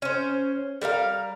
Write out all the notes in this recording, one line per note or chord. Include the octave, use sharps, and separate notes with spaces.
C#4 C5
G3 A#4 C5 F5